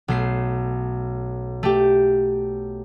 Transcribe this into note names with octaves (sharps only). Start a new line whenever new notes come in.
B1 A3 C7
A3 G4